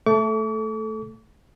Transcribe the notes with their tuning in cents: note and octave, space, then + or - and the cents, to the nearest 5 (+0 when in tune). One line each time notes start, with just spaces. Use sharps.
A3 +0 A4 -15 D6 -45